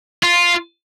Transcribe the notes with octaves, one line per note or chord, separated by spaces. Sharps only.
F4